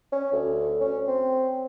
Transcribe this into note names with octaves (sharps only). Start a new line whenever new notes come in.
C#4
D2
C#4
C4